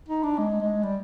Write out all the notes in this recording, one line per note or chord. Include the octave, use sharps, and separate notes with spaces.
D#4
D4
G#3
G#3
G3